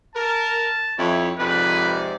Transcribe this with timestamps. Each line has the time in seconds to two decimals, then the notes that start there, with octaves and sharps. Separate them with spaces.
0.15 A#4 A5
0.98 F2 E4 C#5
1.39 F2 G#2 C3 B4 D5